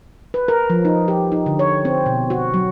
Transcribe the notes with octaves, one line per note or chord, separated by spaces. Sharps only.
B4
A#4
F3
D#4
G4
D#4
D3
C#5
C4
B2
F#4
F#3